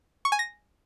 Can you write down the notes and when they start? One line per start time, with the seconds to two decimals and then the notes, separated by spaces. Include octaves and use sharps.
0.25 C#6
0.32 G#5
0.39 A#6